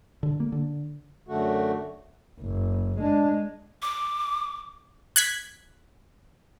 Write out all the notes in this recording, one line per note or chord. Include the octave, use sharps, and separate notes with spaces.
D3
A#3
D3
F#2 D3 A3 F#4
F#1
G#3 D4
D6
F#6 G#6 B6